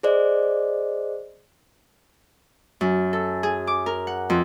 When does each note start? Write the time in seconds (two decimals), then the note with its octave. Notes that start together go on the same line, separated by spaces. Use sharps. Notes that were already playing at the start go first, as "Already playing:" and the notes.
0.03 G#4 C5 D5 D#5
2.81 F#2
3.13 A4
3.43 G#4
3.67 D6
3.86 A#4
4.07 F#5
4.30 F2